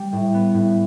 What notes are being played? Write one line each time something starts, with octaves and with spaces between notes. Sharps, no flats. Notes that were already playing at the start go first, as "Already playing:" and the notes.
Already playing: G3
A2
B3
A2